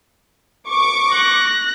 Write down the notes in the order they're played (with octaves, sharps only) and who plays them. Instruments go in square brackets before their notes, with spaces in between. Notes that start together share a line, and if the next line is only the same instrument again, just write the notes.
[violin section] C#6 D6
[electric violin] F#6 A#6